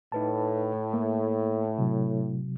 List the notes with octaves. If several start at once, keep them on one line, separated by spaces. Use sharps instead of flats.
A2 D#4 B4 A5
A#3
C3 F#3